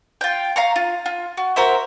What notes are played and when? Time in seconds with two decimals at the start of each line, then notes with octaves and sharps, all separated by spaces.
0.21 F4 G5
0.56 F5 A#5 C#6
0.76 F4
1.06 F4
1.37 F#4
1.56 F#4 A#4 C5 E5